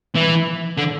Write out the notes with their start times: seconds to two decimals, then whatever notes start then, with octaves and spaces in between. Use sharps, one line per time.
0.15 E3
0.77 D3